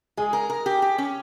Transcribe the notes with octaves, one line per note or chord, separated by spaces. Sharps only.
G#3 G#4
A#4
A#4
G4
G4
C#4